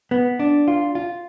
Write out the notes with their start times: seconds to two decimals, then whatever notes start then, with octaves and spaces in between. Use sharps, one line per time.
0.11 B3
0.39 D4
0.68 F4
0.95 F4